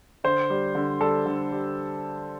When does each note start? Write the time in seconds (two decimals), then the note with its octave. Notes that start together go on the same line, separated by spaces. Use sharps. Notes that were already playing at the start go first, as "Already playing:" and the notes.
0.24 D3 C5
0.50 G3
0.75 D3
1.00 G3 A4
1.26 D3
1.52 G3